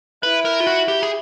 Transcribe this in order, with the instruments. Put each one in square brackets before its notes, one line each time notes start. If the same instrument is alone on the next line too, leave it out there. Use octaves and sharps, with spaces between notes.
[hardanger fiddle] E4 [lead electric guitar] B4
[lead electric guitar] A#4
F4
F#4
G4
G#4